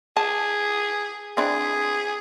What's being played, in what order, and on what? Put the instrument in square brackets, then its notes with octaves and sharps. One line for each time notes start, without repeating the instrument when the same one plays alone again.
[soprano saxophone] G#4 [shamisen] A5
[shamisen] C4 D4 E4 [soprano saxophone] G#4